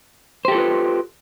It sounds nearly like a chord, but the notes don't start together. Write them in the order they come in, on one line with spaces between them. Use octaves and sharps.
C5 G4 A4 F4 B4